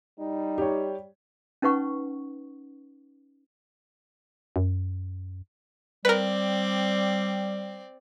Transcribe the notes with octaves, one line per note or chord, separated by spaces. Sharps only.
G3 D#4
G4 C#5
C#4 D#4 B4 F#5 C#6
F#2
G3 C4 A#4 B4 D5